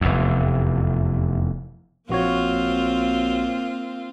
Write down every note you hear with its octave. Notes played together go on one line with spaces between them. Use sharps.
F1 E2
A#1 A#3 C4 F4 F#4 C#5